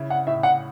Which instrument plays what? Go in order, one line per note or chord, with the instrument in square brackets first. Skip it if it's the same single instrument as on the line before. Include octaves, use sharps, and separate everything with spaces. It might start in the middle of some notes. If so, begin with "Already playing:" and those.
Already playing: [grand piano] C#3 E4
[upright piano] F#5
[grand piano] A2 [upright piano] E5
[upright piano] F#5